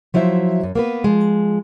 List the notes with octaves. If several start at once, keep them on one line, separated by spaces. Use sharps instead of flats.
F3 F#3 E4 C5 E5
F#2
A#3 B3 B4
F3 G#3